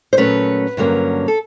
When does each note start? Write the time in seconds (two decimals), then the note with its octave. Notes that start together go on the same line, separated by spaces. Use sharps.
0.13 C5
0.17 A#2 F#3 A3 C#4 B4
0.77 G2 D3 F#3 A#3 C#4
1.28 A4